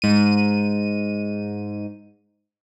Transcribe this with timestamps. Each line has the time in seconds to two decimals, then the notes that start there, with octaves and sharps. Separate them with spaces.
0.02 G#2 D#7